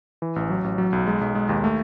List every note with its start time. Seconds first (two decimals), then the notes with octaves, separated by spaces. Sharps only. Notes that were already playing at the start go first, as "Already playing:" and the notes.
0.22 E3
0.36 A1
0.50 F#3
0.64 A1
0.78 F#3
0.93 B1
1.07 G#3
1.21 B1
1.35 G#3
1.49 D#2
1.64 A3